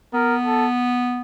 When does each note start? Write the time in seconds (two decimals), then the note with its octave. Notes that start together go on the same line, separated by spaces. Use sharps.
0.13 B3 A#4
0.44 A4